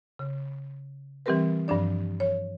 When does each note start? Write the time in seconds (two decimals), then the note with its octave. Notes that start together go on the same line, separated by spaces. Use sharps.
0.19 C#3
1.26 E3 G3 C4 G4 A#4 B4
1.68 G2 F3 D4 D5
2.20 C#5